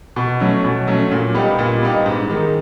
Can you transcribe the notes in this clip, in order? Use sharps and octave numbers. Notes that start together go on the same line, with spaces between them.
B2
F#3 A3 C#4
B2
F#3 A3 C#4
A#2
G3 B3 D#4 G4
A#2
G3 B3 D#4 G4
G#2
D#3 G#3